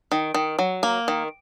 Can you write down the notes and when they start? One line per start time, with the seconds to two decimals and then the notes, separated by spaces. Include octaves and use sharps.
0.12 D#3
0.34 D#3
0.59 F#3
0.83 A#3
1.08 D#3